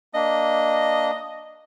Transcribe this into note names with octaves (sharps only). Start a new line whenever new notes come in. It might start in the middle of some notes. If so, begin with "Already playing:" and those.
A#3 D4 D#5